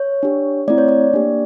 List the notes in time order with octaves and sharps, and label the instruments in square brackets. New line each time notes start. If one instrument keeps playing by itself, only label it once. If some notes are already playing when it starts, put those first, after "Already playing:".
Already playing: [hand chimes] C#5
D4 G4
A3 C4 E4 D5
C#5
D5
A#3 D4 G4